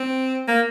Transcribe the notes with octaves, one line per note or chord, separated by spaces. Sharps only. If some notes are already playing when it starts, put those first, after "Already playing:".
Already playing: C4
A#3